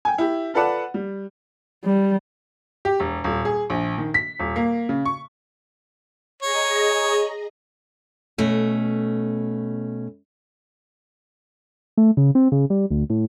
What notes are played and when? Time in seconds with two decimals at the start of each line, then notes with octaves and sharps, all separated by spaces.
0.05 G5 G#5
0.18 E4 G4
0.54 F4 A4 B4 D5 F#5 A5
0.94 G3
1.84 G3
2.85 G4
3.00 E1
3.24 D#1
3.45 G#4
3.70 A#1
3.98 D#3
4.14 B6
4.40 D#1
4.56 A#3
4.89 C#3
5.06 C#6
6.43 G#4 C#5 D#5 A#5
8.38 B2 A3 C#4
11.97 A3
12.17 C#3
12.35 C4
12.52 C#3
12.70 G3
12.91 D2
13.10 A2